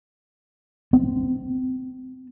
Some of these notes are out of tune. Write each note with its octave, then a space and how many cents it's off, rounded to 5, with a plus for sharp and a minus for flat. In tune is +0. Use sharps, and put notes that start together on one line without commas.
C4 -30